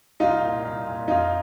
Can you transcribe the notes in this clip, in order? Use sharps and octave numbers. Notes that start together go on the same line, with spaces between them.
C2 D#4 F4
A#2
C2
A#2
F2 D#4 F4